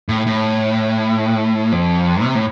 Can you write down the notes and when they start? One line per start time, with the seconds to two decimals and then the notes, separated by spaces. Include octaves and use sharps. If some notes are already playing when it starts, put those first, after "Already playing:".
0.09 A2
0.26 A2
1.72 F2
2.24 C3
2.35 A2